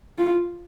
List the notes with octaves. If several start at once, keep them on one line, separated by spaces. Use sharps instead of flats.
F4